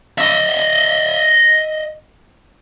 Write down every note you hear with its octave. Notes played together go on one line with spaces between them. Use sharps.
D#5 E5